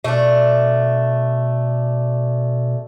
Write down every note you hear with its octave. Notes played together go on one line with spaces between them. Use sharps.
B2 A3 D4